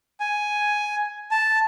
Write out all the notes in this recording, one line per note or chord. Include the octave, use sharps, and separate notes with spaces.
G#5
A5